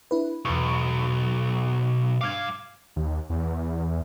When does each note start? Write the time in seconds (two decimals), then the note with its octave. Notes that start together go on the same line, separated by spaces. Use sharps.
0.11 D4 E4 B4
0.45 B1 E2 C#6
2.21 G2 F5 D6 F6 G#6
2.96 D#2
3.29 E2